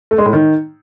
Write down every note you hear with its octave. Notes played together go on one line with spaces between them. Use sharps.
A3
G#3
A2
D#3